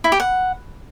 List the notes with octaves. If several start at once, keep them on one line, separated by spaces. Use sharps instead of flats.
E4
G4
F#5